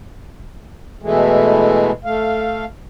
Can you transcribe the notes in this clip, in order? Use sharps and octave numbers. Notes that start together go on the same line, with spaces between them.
B2 E3 G#3 A3
A3 F5